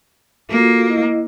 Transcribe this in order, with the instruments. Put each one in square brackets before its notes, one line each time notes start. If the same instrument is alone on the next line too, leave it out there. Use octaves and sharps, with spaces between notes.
[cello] A#3 [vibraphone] F4 F#4 A4
[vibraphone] E4 D#5